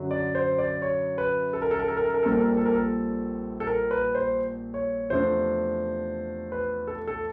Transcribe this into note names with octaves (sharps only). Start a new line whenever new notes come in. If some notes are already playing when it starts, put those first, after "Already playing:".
Already playing: F#2 D3 F#3
D5
C5
D5
C#5
B4
A4
A#4
A4
A#4
A4
A#4
A4
A#4
A#1 A#2 G3 C4 A4
A#4
A4
A#4
A4
A#4
A4
A4
A#4
B4
C5
C#5
E2 C3 F3 A3 D4 C5
B4
A4
A4